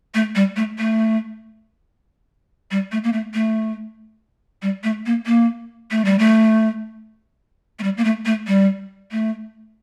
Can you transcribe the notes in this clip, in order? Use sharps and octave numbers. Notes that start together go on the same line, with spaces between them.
A3
G3
A3
A3
G3
A3
A#3
A3
A3
G3
A3
A#3
A#3
A3
G3
A3
A3
G3
A#3
A3
A3
G3
A3